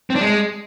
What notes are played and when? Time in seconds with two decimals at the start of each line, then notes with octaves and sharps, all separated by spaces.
0.10 C4
0.16 D4
0.21 G#3